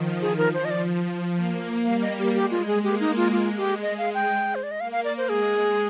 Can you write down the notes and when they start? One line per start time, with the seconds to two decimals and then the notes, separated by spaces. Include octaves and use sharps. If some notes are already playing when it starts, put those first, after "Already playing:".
Already playing: D#3 F3
0.22 G#4
0.38 A#4
0.54 C5
0.65 D#5
0.70 D5
1.36 A#3
1.85 G3 F5
2.02 D#5
2.18 G4
2.35 G#3 G4
2.51 F4
2.67 G#4
2.84 A#3 G4
3.00 D#4
3.17 F4
3.32 G#3 F4
3.57 G4
3.82 D#5
3.98 F5
4.14 G5
4.55 C5
4.63 D5
4.71 D#5
4.80 A#3 F5
4.92 F5
5.05 D5
5.17 C5
5.29 G#3 G#4